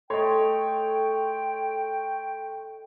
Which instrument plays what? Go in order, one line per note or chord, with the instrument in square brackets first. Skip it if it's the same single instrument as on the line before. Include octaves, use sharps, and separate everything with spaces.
[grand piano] A3 C#5 C6 [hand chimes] A4 D#5 [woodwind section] G5